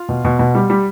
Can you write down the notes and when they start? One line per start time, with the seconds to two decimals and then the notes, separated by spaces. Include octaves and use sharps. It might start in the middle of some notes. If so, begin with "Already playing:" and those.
Already playing: F4 F5
0.09 B2
0.25 B2
0.39 B2
0.55 G3
0.70 G3